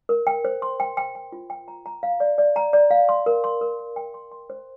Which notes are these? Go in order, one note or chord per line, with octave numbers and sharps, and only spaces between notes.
A#4
G5
C5
C6
G5
G5
G5
F4
G5
A#5
A#5
F5
D5
D5
A#5
D5
F5
C6
A#4
C6
A#4
C6
G5
C6
C6
C5